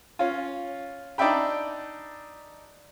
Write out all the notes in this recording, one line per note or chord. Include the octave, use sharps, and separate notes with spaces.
C#4 F4
D4 D#4 D5 E5 G5 B5